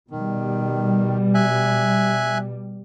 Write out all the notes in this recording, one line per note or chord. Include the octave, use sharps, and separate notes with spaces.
B2 D#3 G3
E5 G#5 F#6